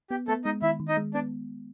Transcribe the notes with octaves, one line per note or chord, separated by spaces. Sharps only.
B3 G4
A3 B3 A4
G#3 D#4 D#5
D#3 E4 E5
D#3
D#4 D#5
G#3
B3 D4 D5